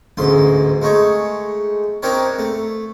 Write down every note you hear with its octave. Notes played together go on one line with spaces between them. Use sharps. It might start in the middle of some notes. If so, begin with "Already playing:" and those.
A1 D2 G#2 C6
G#3 A3 D#4 C#5
C4 D4 D#4 G4 A#4 C#5
A3